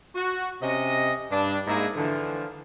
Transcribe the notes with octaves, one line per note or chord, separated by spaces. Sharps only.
F#4
C3 C#4 D#5
G2 D4
G#2 G#3 A#3 D4 E4 G#4
D3 E3 F3